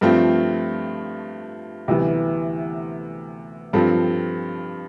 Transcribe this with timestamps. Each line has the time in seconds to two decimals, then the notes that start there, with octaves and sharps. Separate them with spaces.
0.01 G2 F3 A3 C4 F4
1.88 D2 C3 E3 G3 B3
3.73 G2 F3 C4 F4 A4